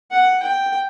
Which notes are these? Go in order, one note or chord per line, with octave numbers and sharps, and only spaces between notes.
F#5
G5